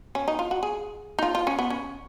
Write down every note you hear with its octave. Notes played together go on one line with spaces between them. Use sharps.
C#4
D#4
F4
F#4
G#4
D#4
F4
F4
C#4
B3
C#4